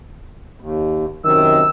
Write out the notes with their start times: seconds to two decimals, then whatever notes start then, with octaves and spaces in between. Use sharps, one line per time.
0.61 D#2
1.25 F#2 C3 D#3 E6